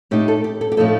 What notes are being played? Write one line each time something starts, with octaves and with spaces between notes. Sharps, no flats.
A2 A3 D#4 G4
A4
G4
A4
G4
A2 F3 A3 D#4 A4